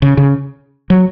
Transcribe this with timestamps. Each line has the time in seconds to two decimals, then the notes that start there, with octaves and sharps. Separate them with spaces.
0.02 C#3
0.17 C#3
0.90 F#3